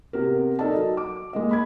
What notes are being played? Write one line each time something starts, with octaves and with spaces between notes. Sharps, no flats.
C3 B3 A#4
D#4 A4 A#4 D5 D#5 A5
F#3 D#5
D6
G#3 A#3 D#5
B5 G#6